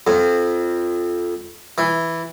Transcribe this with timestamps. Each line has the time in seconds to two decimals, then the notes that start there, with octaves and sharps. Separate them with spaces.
0.07 F2
1.78 E3